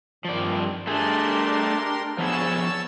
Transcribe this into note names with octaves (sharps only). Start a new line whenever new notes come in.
G2 D#3 F3 C4 D5
A3 D4 G4 G#4 A#4 C6
F3 B3 G#4 C#5 A5 E6